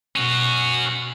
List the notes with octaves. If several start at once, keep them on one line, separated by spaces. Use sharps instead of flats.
B2 C#4 F#4